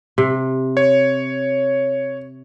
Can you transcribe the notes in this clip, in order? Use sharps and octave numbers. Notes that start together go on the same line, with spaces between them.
C3
C#5